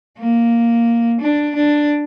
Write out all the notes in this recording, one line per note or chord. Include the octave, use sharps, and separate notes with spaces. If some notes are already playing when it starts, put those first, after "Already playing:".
A#3
D4
D4